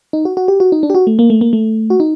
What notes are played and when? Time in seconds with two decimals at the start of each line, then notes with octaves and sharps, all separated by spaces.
0.13 D#4
0.25 F#4
0.37 F#4
0.48 G4
0.60 F#4
0.72 D#4
0.83 D4
0.90 G4
0.95 F#4
1.07 A3
1.19 A#3
1.30 A3
1.41 A#3
1.53 A3
1.90 F#4
2.00 D#4